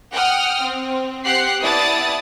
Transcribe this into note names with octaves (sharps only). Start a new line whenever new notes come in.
F#5 G5 D#6 F6
C4
C4 G4 F#5 F#6 C7
B3 E4 D5 A5 D#6 A6